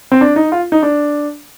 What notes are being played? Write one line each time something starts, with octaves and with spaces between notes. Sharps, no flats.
C4
D4
D#4
F4
D#4
D4